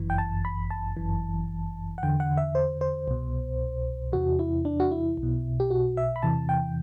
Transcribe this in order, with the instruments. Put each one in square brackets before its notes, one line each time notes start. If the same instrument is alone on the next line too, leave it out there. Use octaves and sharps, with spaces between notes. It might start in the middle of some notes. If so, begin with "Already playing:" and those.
Already playing: [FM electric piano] G1 F#2 E3
G5
A5
B5
A5
G1 F#2 E3
F#5
E2 D3 G5
F#5
E5
C5
C5
C2 B2
E2 C3 E3 F#4
E4
D4
F#4
E4
B1
B2
G4
F#4
E5
B5
E2 C3 E3 A5
G5